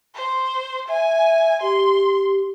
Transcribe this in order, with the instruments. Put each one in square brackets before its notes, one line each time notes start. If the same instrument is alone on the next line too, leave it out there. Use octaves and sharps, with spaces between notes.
[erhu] C5
[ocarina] E5 [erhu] G#5
[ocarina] G4 [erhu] C6